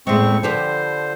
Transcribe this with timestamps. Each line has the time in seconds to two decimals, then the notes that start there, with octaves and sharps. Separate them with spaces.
0.07 E2 A2 G#3 C4 C#6
0.43 D3 F3 G4 B4 C5